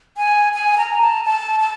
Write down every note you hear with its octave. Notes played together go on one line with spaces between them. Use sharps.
G#5
G#5
A#5
A5
A5
A5